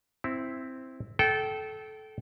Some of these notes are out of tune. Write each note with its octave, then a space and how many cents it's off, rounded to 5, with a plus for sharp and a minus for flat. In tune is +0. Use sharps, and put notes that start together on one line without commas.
C4 +0 E4 +0
A4 -20 G5 -25